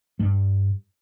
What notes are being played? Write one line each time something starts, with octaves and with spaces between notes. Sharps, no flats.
G2 G3